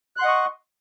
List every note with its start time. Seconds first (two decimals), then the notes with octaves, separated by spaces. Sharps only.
0.17 F#6
0.20 C6
0.22 F#5
0.25 D#5
0.28 C#6